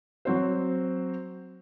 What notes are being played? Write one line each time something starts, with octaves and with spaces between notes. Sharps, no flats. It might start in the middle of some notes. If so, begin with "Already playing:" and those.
F#3 C4 C5